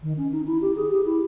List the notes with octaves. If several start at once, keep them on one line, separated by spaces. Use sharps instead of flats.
D#3
C#4
D#4
E4
G4
G#4
G4
E4